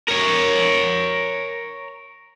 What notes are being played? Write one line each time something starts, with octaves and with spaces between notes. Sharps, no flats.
A#4 C#5